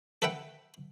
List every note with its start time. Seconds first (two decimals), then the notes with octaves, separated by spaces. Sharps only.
0.22 A4 B4 E5 F#5 G5